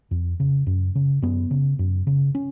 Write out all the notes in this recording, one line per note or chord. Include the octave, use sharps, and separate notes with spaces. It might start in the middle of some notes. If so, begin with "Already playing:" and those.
F2
C#3
F#2
C#3
F#2 B3
C#3
F#2
C#3
C#4